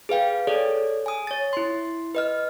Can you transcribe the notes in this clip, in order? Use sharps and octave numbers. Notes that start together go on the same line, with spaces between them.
G#4 B4 F5 G5
G#4 A4 C#5 D5
G#5 D#6
C#5 A6
E4 C6
B4 D#5 F6